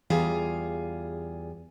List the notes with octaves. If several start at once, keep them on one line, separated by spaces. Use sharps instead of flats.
E2 G3 F4 G#4 F5